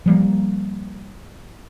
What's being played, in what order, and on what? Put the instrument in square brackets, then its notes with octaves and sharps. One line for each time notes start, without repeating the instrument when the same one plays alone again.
[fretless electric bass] F3 G3 A#3